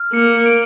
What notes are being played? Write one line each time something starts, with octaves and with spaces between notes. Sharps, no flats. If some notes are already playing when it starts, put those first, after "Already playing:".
Already playing: F6
A#3 C#7
D7